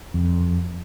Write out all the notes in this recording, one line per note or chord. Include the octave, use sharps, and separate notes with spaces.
F2